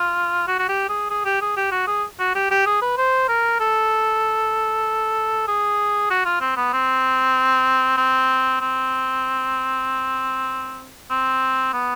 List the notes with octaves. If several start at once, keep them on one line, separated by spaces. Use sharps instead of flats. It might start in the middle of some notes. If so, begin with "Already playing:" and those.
Already playing: F4
F#4
F#4
G4
G#4
G#4
G4
G#4
G4
F#4
G#4
F#4
G4
G4
G#4
B4
C5
A#4
A4
G#4
F#4
F4
C4
B3
C4
C4
C4
C4
B3